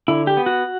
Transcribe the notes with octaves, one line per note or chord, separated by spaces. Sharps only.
D3 E4
G4
B3
F#4